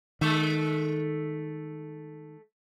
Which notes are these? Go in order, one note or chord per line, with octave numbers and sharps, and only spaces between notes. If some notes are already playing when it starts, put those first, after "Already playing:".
D#3 G#3 A3 E5